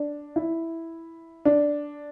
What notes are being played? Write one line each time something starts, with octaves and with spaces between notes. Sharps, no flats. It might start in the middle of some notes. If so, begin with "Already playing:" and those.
Already playing: D4
E4
D4